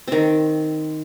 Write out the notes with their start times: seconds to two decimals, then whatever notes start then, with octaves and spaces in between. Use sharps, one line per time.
0.08 D#3 C4